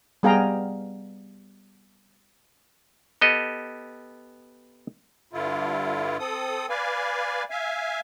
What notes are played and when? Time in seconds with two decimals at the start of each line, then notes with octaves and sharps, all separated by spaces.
0.23 G3 B3 G#4 F5 G5 A#5
3.21 B3 G4 A4 D#5
5.33 G2 D3 E4 F4
6.19 C4 A4 D#6
6.69 B4 D5 F5 G#5
7.50 E5 F5 G#5